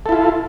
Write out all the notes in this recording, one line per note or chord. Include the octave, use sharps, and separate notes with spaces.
E4 F4 A4